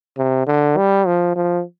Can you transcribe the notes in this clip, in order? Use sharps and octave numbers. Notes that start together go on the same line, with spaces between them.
C3
D3
G3
F3
F3